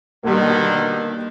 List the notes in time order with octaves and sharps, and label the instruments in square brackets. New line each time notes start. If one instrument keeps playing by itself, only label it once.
[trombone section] B2 D3 D#3 [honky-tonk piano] G3 A#3